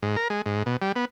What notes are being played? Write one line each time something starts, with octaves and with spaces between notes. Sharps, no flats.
G#2
A#4
G#3
G#2
B2
G3
B3